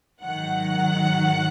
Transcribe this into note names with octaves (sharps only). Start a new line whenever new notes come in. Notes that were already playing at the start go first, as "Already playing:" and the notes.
G#2 D#3 F#3 F#5